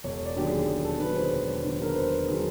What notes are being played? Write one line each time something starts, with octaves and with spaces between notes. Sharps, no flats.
E1 C#5
D5
D#2 D3 F#3 G4
G#4
E1 G#4
A4
D#2 D3 F#3 B4
C5
E1 C#5
D#2 D3 F#3
A#4
B4
E1 C5
D3 F#3 G#4